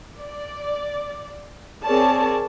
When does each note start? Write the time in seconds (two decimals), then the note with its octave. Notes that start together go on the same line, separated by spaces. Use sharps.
0.20 D5
1.84 C4 G#4 A#4 C#5 D5 A5